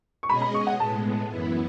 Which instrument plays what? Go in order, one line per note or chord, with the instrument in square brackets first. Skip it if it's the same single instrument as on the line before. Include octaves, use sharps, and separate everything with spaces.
[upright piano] C#6
[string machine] B2 G#3 C#4 G#4 D#5 [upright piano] B5
[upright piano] B5
C#6
F#5
[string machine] A2 G#3 B3 [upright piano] A5
[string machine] F#2 E3 B3 E4